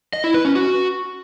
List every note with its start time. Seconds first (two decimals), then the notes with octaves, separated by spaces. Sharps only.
0.13 D#5
0.24 E4
0.34 B4
0.45 C#4
0.55 F#4